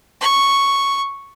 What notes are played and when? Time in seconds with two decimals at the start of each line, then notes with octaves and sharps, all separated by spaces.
0.21 C#6